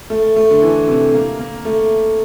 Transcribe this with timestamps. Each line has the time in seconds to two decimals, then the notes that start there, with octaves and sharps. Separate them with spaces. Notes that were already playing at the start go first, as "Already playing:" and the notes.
0.10 A3
0.36 A3
0.51 D3
0.62 E3
0.88 C3
1.14 A#3
1.39 A#3
1.65 A3